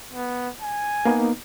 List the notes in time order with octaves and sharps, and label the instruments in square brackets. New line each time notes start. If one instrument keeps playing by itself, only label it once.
[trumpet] B3
G#5
[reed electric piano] A#3 B3 D#4